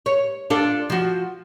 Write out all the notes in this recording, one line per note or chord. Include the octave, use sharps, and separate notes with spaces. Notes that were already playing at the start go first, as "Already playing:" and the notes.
C#5
D4 F4 A4
F3 F#4